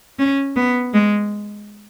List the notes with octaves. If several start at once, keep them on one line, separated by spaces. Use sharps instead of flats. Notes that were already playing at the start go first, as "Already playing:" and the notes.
C#4
B3
G#3